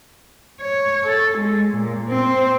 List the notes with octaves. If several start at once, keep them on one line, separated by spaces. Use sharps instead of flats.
C#5
A4
G#3
A#2
C4